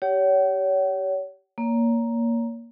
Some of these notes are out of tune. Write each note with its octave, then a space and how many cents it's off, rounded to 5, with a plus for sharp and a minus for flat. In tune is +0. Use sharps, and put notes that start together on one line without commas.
G4 -15 C#5 +30 F#5 +45
A#3 +0 C#5 +35